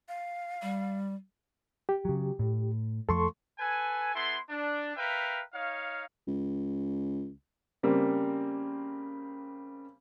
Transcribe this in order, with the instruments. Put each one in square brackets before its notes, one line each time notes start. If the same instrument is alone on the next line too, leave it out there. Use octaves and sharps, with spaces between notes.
[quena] F5
[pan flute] G3
[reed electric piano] G4
[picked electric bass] C#3 F#3
A2
[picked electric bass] F2 F3 A3 [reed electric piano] A4 C6 C#6
[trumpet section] A4 B4 G#5
B3 E4 A4 C6
D4
A#4 B4 E5 F5 G5
D#4 C#5 F5
[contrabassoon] C#2
[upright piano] C#3 G3 A#3 C4